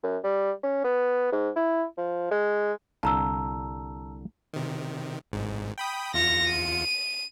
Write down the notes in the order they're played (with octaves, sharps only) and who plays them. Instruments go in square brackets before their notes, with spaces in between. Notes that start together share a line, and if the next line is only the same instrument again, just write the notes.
[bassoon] F#2
G3
C#4
B3
G#2
E4
F3
G#3
[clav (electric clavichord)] C2 D3 F5 [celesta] A5 A#5 E6
[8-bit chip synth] C3 D#3
G#1 G#2
G5 B5 D#6
[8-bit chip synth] E2 F4 C#7 [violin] A#6 F7
[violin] D#7